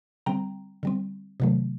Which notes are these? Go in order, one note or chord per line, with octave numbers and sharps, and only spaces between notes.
D3 G3 C4 G5 A#5
D3 G3 C4
C3 D#3 F#3 A3